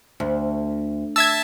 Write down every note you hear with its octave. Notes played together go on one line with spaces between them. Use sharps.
D2
E5 A5 E6 G#6